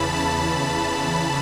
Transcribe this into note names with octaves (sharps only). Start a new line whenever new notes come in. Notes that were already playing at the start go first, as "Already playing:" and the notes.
Already playing: E2 C#3 E3 A5 B5
A5